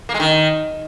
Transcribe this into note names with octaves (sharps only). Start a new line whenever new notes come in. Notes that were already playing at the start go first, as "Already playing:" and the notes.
A#3
G#3
D#3